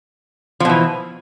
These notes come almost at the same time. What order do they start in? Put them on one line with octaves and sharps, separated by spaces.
F3 B2 E3